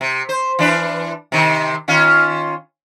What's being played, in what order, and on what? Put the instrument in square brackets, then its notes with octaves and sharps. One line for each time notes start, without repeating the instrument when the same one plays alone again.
[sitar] C3
C5
E3 D4 B4
C3 D#3
D#3 C#4 F4